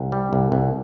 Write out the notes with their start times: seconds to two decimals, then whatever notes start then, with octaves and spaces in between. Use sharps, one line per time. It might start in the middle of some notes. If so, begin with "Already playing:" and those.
Already playing: C2
0.12 G3
0.33 C2
0.52 C2